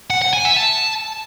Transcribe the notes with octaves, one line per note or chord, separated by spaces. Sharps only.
F#5
F#5
G#5
E5
A5